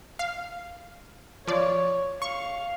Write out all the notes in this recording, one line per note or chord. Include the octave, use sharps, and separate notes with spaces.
F5
F3 C#5 D5
F5 C#6